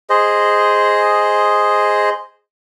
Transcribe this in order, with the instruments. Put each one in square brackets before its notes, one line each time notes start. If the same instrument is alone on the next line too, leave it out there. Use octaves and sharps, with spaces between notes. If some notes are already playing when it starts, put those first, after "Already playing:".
[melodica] G#4 C5 D#5